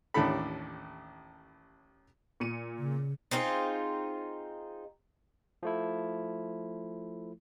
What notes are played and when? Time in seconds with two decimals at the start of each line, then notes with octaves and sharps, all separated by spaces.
0.14 A1 D#2 A2 D4 A4 B5
2.40 A#2 C#7 D#7
2.78 C#3
3.31 C4 D#4 F4 G#4
5.63 F3 A3 E4